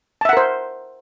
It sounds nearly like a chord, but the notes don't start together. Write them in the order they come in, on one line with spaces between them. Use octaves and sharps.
A5 E5 F#5 A#4 C5